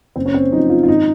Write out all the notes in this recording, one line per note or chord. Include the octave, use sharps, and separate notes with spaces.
F#1 C4
C#4
C4
F#2 F3 D#4
F4
F4
G#1 D#4